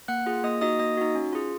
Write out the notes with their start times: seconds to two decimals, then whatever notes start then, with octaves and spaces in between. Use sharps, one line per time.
0.08 A#3 F#5 F#6
0.26 F4 G#4
0.44 A#3 D#5 D#6
0.61 D#4 F#4 D#5 D#6
0.79 A#3 D#5 D#6
0.97 D#4 F#4
1.15 C#4
1.33 F4 G#4